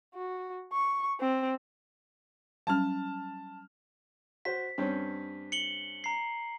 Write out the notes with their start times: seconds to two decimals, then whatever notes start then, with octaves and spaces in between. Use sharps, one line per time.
0.15 F#4
0.73 C#6
1.20 C4
2.67 F#3 G3 C#4 A5 F6
4.45 F#4 C5 B6
4.78 G2 C4 C#4
5.52 C#7 F#7 G7
6.04 A#5 C7